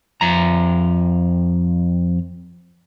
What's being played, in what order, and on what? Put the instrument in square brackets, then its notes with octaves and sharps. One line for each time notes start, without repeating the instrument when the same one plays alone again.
[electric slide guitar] F2 A#5